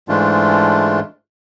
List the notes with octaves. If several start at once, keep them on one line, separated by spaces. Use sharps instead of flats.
G#2 E3 G#3 A3 D4 F4